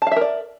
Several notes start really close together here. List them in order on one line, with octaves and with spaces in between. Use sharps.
A5 F5 E5 A#4 D5